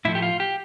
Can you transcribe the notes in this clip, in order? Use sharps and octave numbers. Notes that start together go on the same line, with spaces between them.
A2 F3 A3 E4
G4
F4
G4